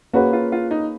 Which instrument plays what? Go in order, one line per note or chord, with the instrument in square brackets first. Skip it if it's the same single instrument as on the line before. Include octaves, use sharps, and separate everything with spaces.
[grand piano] A#3 C#4 G#4 B4 [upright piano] F#4
[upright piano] F4
F4
D#4